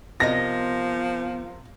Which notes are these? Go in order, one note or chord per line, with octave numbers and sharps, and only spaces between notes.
C3 F3 B3 A#4 D#5 A#6